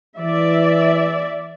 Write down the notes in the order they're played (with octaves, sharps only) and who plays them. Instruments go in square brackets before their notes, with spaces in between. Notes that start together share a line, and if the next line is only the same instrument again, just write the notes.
[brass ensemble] E3 [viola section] D5 E5